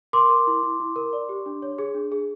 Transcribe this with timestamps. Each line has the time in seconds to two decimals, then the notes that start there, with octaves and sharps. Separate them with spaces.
0.13 A#4 C6 D6
0.30 A#4
0.47 E4
0.63 E4
0.80 E4
0.96 A#4
1.13 D5
1.29 G4
1.46 D4
1.62 C#5
1.78 G#4
1.95 D4
2.12 G#4